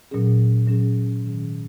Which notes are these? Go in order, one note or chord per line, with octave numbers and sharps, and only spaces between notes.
A#2 F#3 C#4 G#4
A#2 F#3 C#4 G#4
G#2 D#3 F#3 C#4 G#4